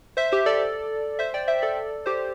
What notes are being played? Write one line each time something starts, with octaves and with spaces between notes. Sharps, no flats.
C5 E5
G4 C5
A4 D5
C5 E5
D5 G5
C5 E5
A4 D5
G4 C5